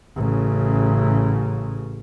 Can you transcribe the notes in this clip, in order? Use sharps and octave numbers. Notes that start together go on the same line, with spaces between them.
A1 C#3